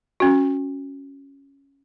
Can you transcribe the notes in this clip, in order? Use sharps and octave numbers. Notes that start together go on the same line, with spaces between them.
C#4 F#4